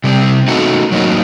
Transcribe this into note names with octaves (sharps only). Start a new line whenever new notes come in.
C3 G3 C4
A3 D#4 F#4
F#3 A#3 D#4